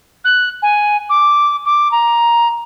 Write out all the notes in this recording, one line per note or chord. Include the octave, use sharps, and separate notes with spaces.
F#6
G#5
D6
D6
A#5